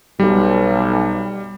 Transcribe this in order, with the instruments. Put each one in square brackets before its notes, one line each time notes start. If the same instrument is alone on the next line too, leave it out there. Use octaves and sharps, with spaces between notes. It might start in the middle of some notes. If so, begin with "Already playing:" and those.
[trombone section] B1 [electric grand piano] G3